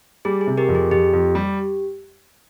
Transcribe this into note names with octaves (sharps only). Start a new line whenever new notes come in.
G3 G#4
G#4
C3
G4 A#4
F2
G#4
F2 G4
F2
G3